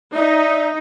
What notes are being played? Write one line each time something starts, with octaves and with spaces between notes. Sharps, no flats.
D#4 D5 E5